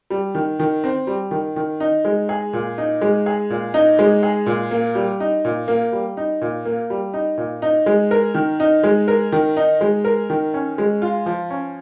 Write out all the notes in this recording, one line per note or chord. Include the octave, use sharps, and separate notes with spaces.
G3
D#3
D#3
C4
G3
D#3
D#3
D#4
G#3
G#4
A#2
D#4
G#3
G#4
A#2
D#4
G#3
G#4
A#2
A#3
G3
D#4
A#2
A#3
G3
D#4
A#2
A#3
G3
D#4
A#2
D#4
G#3
A#4
D#3
D#4
G#3
A#4
D#3
D#4
G#3
A#4
D#3
C#4
G#3
F4
F3
C#4